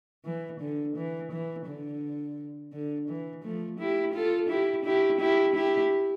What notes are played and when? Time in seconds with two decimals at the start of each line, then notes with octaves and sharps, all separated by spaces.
0.25 E3
0.60 D3
0.96 E3
1.32 E3
1.66 D3
2.73 D3
3.09 E3
3.43 F3 A3
3.79 E4 G4
4.14 F4 A4
4.49 E4 G4
4.85 E4 G4
5.20 E4 G4
5.55 E4 G4